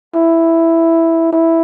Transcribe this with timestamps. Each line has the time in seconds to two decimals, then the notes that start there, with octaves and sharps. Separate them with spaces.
0.15 E4
1.33 E4